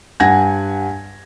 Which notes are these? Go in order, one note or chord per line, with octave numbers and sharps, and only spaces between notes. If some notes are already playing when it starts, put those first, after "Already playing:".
G2 F#5 G#5 G#6 A#6